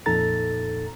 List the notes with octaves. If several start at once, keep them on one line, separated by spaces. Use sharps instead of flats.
F2 A#2 D#4 A4 A#5 A6